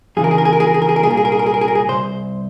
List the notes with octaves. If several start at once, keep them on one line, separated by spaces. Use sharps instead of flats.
F2 C#3 E3 G#4
A#4
G#4
A#4
G#4
A#4
G#4
A#4
G#4
A#4
G#4
A#4
C2 A#2 G#4
A#4
G#4
A#4
G#4
A#4
G#4
A#4
G#4
A#4
G#4
C2 A#2 C5